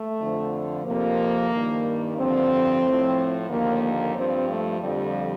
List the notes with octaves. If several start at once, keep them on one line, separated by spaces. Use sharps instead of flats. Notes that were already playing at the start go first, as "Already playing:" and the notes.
Already playing: A3
F2 D3 F3
F2 C3 F3 A#3
G2 D#3
G2 D3 F3 C4
A2 F3
D#2 D3 F3 A#3
A#3
G2 F3 C4
A3
F2 D3 F3 G3